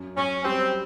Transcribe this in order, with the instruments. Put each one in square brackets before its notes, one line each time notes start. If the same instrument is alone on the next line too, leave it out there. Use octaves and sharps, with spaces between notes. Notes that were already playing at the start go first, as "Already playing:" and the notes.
Already playing: [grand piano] F#2
[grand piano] F#2 [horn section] C#4
[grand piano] G3 [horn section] C4